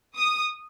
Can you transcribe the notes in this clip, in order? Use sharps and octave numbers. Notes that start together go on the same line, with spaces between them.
D#6